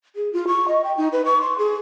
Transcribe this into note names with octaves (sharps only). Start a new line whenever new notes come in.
G#4
F4
C#6
D#5
G5
D#4
B4
C#6
C6
G#4